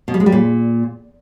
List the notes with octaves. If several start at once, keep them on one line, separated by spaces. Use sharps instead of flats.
B2
G3
G#3
G3
A#2